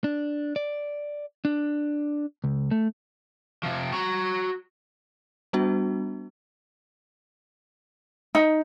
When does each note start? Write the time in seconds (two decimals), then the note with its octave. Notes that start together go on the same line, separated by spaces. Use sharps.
0.04 D4
0.56 D5
1.45 D4
2.44 C#2
2.71 A3
3.63 C3 F3
3.92 F#4 A#5
5.53 G3 B3 D4 F#4
8.35 D#4